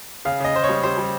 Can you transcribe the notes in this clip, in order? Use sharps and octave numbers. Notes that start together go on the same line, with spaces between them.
C#3 F5
C#3 D#5
C#3 C5
C#5
G3
G3 C5
G3